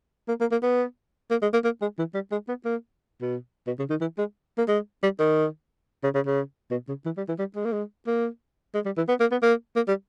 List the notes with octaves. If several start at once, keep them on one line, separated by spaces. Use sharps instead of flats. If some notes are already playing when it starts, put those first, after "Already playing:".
A#3
A#3
A#3
B3
A#3
G#3
A#3
A#3
G#3
E3
G3
G#3
B3
A#3
B2
B2
C#3
D#3
E3
G#3
A#3
G#3
G3
D#3
C#3
C#3
C#3
B2
C#3
E3
G3
E3
G3
G#3
A#3
G#3
A#3
G#3
G3
E3
B3
A#3
B3
A#3
A#3
G3